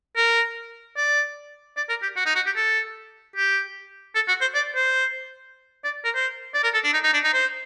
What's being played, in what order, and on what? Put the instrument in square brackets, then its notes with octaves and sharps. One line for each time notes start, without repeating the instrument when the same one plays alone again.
[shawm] A#4
D5
D5
A#4
G4
F#4
D#4
F#4
G4
A4
G4
A4
F#4
C5
D5
C5
D5
A#4
C5
D5
A#4
A4
D4
D#4
D#4
D4
D#4
C5